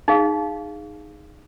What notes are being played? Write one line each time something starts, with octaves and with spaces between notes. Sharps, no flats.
D#4 G#4 F5